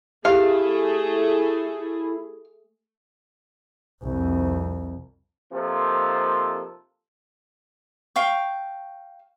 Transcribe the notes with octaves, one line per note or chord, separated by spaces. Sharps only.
A3 E4 G4 G#4 F5
C2 F2
C3 F3 A#3 D#4 F4 A4
F5 G5 C#6